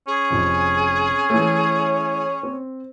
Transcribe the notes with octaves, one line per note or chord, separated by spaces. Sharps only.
C#4 G#4
F1 F2
E3 A3 C#5
C4